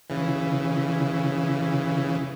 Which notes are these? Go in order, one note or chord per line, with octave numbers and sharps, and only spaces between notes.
C#3 E3